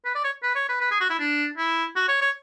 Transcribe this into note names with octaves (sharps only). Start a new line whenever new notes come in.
B4
D5
C#5
B4
C#5
B4
B4
G#4
F#4
E4
D4
E4
F#4
C#5
C#5